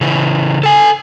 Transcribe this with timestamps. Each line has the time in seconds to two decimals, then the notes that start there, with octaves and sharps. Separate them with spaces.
0.01 C#3 E3
0.63 A4 G#5